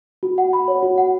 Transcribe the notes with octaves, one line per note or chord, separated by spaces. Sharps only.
F#4
F#5
B5
C#5
F#4
F#5